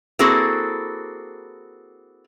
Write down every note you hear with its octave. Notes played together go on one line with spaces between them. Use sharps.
A#3 C4 E4 F#4 G#4 A4